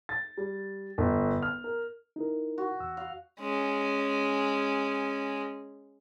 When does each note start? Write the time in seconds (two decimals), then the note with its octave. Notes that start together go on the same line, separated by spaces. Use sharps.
0.09 A6
0.38 G3
0.98 G1
1.42 F6
1.64 A#4
2.16 D#4 E4 A#4
2.58 F#4
2.80 E2 E6
2.97 F5
3.40 G#3 C#4